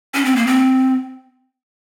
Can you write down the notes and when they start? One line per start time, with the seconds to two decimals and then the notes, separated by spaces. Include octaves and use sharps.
0.14 C#4
0.25 C4
0.36 A#3
0.47 C4